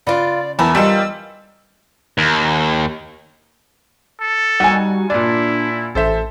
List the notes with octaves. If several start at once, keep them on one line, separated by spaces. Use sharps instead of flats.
C#3 B3 F4 D5
E2 E4 A#4 A5
D#3 F3 G3 D#5 F#5 E6
D#2
A4
G3 D#4 F#4 F#5 G#5
A#2 D4 E4 D5
A1 A4 C5 E5